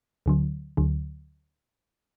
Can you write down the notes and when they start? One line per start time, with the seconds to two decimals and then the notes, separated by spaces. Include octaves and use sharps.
0.26 D2 D3 F#3
0.77 D2 D3 F#3